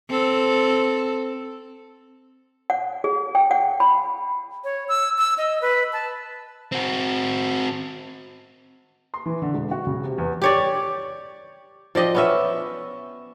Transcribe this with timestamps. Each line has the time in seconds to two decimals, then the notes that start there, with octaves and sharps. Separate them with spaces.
0.10 C4 A4
2.70 F#5
3.04 G#4
3.35 G5
3.51 F#5
3.80 B5
4.64 C#5
4.89 E6
5.18 E6
5.38 D#5
5.62 B4
5.93 A5
6.72 C4 F#4
9.14 C6
9.26 E3
9.42 D3
9.54 E1
9.71 F#4
9.87 C#3
10.03 C3
10.18 E2
10.42 G4 C#5 D5
11.95 F3 D5 D#5 G5
12.15 B3 C#4 E5